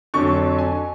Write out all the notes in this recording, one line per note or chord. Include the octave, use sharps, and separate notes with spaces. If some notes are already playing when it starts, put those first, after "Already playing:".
F2 D3 F#3 C#6
G#5